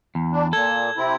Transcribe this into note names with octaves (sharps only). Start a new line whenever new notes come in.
E2
D4
A#2 A4 G#6
C3 C4 E4